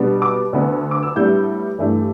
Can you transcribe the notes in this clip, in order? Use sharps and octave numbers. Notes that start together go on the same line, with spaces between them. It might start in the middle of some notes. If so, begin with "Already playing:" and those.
Already playing: B2 G3 B3 D4
D6
D2 D3 B3 D4
D6
E6
A2 G3 B3 D4 G6
G2 E3 A3 D4